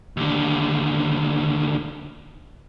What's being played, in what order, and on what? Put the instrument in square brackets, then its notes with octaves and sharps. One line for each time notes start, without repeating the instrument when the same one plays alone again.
[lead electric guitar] D#2 D3